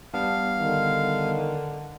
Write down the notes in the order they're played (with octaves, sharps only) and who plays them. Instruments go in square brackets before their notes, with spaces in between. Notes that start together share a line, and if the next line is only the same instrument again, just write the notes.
[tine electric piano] G3 B3 D4 [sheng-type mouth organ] F5
[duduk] D3 [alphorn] D#3